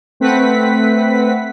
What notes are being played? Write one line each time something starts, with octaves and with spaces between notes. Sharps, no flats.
A3 C4 B4 F#5 B6